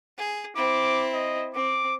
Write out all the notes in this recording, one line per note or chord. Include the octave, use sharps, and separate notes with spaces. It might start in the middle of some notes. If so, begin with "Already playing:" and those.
G#4
C4 E4 D6
D#5
C4 D6